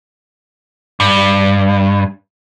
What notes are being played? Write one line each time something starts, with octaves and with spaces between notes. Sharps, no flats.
G2